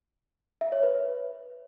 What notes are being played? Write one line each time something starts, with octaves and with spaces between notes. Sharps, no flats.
E5
C#5
B4